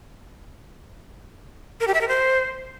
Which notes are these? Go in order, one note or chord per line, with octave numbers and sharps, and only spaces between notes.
A#4
G4
E5
A#4
C5